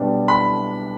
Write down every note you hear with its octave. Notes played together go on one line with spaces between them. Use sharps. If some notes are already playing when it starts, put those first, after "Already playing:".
Already playing: B1 B2 G3 D4
B5